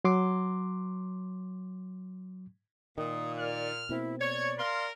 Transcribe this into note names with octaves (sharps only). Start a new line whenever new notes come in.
F#3 C6 D6
A#2 D#3 D#6
D5 F6
B2 A#3 C4 E4
C#5 D5 G#6
A#4 F5 C6